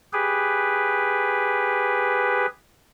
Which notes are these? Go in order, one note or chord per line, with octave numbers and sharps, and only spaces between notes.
G4 G#4 B4